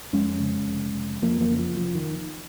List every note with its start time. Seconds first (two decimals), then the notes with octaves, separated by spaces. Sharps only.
0.13 F2 G#3 C#4
0.40 C#3
0.68 F1
0.95 F1
1.22 F2 F3 A#3
1.40 F3 A#3
1.50 C#3
1.59 F3
1.77 F1 F3
1.95 D#3